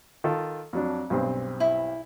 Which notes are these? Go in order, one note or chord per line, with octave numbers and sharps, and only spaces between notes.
D#3 F4 A4
F2 F#3 D4
B1 G2 C4
E4